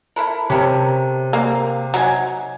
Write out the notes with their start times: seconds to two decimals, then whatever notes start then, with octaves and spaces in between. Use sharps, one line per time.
0.16 E4 A4 A#4
0.50 C3 C#4 A4 A#4
1.33 A#3
1.94 F#3 D#4 G#5